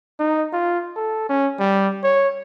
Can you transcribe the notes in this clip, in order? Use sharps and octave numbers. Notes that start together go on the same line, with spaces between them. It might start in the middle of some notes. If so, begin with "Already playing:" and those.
D#4
F4
A4
C#4
G3
C#5